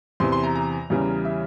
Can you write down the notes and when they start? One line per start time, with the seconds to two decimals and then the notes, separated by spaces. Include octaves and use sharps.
0.20 E2 C3 E3 C6
0.32 C6
0.43 A#5
0.55 A#5
0.90 E2 C#3 E3 G3
1.25 E5